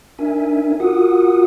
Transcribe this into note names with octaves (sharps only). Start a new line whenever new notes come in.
D4 D#4 A#4 E5 G#5
F4 F#4 A#4 F#5 D#6